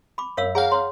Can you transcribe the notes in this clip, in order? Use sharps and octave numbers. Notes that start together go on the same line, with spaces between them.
B5 D6
F#2 C#5 F5 E6
G#4 C#5 F5 F#5 G#5 A#5
C#5 C6